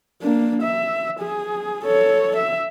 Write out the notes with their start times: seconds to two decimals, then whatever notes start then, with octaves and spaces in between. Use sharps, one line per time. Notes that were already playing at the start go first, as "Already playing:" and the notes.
0.22 A#3 D4
0.62 E5
1.19 G#4
1.84 A4 C#5
2.36 E5